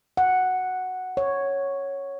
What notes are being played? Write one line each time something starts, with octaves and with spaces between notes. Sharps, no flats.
F#5
C#5